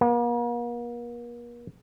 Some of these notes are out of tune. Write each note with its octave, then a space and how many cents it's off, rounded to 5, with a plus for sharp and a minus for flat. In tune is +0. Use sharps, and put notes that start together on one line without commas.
A#3 +45